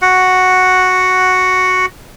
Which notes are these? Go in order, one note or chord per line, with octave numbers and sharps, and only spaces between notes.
F#4 F#5